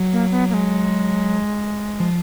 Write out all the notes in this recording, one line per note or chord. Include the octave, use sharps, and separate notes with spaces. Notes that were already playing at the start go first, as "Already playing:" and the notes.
Already playing: F#3
A#3
B3
A#3
G#3
F3